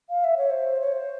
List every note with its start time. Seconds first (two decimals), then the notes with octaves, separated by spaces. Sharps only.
0.09 F5
0.24 E5
0.37 C#5
0.50 C5
0.80 C#5
0.92 C5